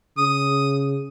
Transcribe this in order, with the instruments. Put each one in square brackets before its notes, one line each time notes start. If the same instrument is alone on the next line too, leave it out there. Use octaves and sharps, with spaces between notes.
[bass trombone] C#3 [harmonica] D#6